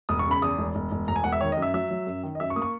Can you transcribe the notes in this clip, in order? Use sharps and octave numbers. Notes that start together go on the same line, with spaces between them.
E1 D#6
C#6
C#3
B5
E2 D#6
E1
E1
E1
E1 A#5
G#5
E1 F#5
E5
D#3 C#5
D#5
F#2 E5
F#3 E5
F#3
F#2
D#3
D#5
F#2 E5
C#6
A#3 D#6
C#6